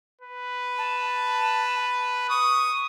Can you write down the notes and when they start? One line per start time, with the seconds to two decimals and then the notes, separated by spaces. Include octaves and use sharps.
0.21 B4
0.78 A5
2.29 C#6 D#6